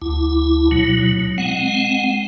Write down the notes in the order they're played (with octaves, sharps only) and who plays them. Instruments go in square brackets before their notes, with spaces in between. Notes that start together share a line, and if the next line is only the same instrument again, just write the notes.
[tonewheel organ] D2 E4
B2 F#3
G#3 C4 F#5